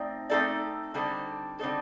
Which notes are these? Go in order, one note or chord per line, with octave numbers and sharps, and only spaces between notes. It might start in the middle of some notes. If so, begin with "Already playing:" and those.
Already playing: A3 C4 D#4 D5
A3 C4 D#4 A4 D5
D3 G3 C4 D#4 A4
D3 G3 C4 D#4 A4